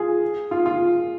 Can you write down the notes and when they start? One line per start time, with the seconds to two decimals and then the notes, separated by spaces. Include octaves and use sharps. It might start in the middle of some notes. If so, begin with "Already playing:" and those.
Already playing: F4 G#4
0.51 F4
0.66 F4